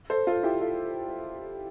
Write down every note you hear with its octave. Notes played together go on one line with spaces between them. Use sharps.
A4 C5
F4 A4
E4 G4
F4 A4